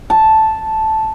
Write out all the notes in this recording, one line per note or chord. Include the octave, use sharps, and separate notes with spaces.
A5